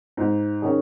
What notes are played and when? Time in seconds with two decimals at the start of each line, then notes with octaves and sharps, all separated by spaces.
0.17 G#2
0.62 D#3 C#4 G#4